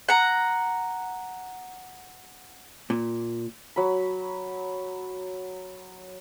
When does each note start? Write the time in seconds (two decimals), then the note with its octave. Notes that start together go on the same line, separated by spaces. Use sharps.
0.09 F#5 A#5
2.90 A#2
3.76 F#3 B5